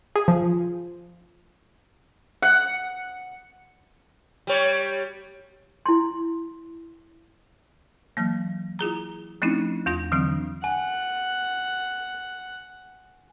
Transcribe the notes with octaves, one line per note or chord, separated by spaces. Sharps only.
G#4
F3
F#5
G3 C#5
E4 C6
E3 F#3 A#3
E4 F4 G#4 A#5
F3 A3 C4 C#4 D#4 E4
E2 D4 F4 A#6
D3 E3 F#3 C4 D4
F#5 G#5